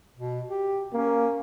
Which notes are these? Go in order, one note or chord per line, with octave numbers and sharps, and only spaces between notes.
B2
G4
A#3 C#4